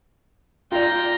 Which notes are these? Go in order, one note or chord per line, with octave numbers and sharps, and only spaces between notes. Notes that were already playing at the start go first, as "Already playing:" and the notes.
F4 D5 G5 A#5